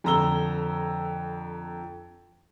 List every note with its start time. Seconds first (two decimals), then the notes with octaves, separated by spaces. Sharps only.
0.04 F2 D3 A#5 E6 G7